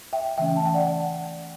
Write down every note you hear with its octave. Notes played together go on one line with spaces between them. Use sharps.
E5 G5
C#3 E3 A3 C#4 E5 G5
A5
G5
D5 F#5